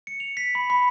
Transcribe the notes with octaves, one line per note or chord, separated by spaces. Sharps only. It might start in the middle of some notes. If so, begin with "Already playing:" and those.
C#7
F7
B6
B5
B5